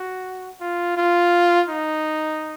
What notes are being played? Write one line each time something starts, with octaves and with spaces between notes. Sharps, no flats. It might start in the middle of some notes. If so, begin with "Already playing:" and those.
Already playing: F#4
F4
F4
D#4